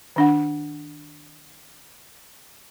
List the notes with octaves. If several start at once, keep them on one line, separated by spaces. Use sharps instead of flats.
D#3 D4 F#5